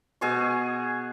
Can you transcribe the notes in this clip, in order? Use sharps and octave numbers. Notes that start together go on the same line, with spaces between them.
B2 G#4 C#6